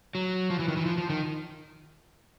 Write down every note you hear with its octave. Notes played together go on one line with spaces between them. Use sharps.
F#3
F3
E3
D#3
E3
F3
F3
D#3